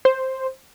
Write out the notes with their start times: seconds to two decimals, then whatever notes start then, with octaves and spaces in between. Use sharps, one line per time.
0.05 C5